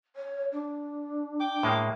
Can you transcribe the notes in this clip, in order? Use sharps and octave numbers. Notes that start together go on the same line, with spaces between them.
C#5
D4
G5 D6
A2 G#3 A#3